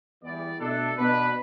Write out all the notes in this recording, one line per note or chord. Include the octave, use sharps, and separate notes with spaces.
E2 E3 G3 B3 D5
B2 A3 D4 A4
B2 B3 D4 B4